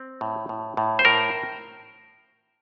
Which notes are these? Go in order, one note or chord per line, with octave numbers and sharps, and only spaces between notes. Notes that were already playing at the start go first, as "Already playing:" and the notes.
Already playing: C4
A2
A2
A2
C5
A2 A#4